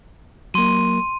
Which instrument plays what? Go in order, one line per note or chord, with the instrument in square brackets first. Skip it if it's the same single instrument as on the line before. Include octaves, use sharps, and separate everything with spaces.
[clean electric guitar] F#3 A#3 [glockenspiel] C6 D#7